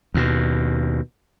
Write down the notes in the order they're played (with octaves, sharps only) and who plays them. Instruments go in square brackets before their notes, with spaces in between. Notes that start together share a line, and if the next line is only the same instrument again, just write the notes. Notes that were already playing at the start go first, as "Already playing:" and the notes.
[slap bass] D#2 B2